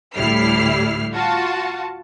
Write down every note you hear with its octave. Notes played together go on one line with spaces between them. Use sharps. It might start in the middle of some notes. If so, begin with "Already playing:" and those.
D2 A2 G3 E4 F6 C7
F4 F#4 A5